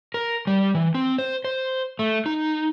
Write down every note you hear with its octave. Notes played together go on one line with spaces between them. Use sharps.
A#4
G3
E3
C4
C5
C5
A3
D#4